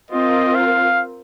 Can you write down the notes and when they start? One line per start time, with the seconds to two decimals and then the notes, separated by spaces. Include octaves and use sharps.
0.11 C4 F4 A#4 D#5
0.55 F5